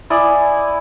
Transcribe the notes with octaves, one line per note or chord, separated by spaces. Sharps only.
E4 D5 D#5 G#5